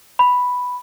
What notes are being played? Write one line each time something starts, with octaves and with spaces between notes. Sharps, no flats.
B5